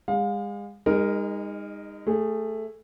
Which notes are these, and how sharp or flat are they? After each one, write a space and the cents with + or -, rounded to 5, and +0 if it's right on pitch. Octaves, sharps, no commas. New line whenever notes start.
G#3 -35 F5 +30
G#3 -40 D#4 +0 A#4 +0
A3 +0 G#4 -20